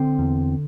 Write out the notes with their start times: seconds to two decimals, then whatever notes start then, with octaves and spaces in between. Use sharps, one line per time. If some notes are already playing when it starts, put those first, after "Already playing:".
Already playing: D3 C4
0.19 E2